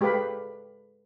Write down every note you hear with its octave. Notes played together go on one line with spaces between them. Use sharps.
G#3 G4 A4 B4 F5 B5